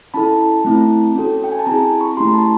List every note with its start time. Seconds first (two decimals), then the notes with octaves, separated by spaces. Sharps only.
0.14 C#4 E4 A4 A5 B5
0.65 A3 C4 E4
1.15 C#4 F#4 A4
1.44 G5
1.52 G#5
1.59 A5
1.66 C4 E4 G#4 G#5 A#5
2.00 B5 C#6
2.17 A3 C#4 E4 G4 A#5 C6
2.29 C6
2.34 A5 B5